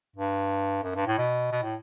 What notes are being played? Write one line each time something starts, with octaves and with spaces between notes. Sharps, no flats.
G2
F#2
G2
A2
B2
B2
A2